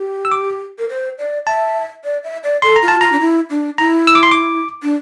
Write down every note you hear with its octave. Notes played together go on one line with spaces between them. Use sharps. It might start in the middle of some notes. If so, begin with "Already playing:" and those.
Already playing: G4
E6
D6
A#4
C5
D5
E5 A5
D5
E5
D5
A4 C6
A#5
F4
A5
F4 A#5
D4
E4
D4
E4 A#5
E6
D6
C6
D6
D4